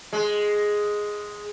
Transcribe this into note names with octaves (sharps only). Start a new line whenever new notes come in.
G#3